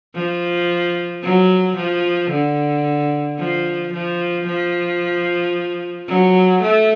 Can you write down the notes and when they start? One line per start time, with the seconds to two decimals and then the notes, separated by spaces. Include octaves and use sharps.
0.15 F3
1.23 F#3
1.76 F3
2.30 D3
3.38 F3
3.93 F3
4.47 F3
6.08 F#3
6.63 A3